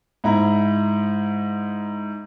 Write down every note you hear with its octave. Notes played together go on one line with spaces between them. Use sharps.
G#2 E4 A#5